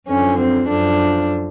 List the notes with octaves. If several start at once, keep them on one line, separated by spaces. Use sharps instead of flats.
F#2 D3 F3 C#4
C4
F#2 D3 F3 D4